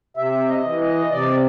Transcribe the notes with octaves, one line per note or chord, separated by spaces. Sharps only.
C3 E5
D#5
E3
D#5
C3 D5